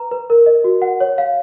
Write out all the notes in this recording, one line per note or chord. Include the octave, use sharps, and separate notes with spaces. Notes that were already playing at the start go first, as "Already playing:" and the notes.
Already playing: B4 A#5
B4
A#4
D#5
F#4
F#5
C#5
F5